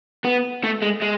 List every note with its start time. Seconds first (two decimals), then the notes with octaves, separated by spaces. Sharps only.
0.24 B3
0.64 A3
0.82 G#3
1.01 G#3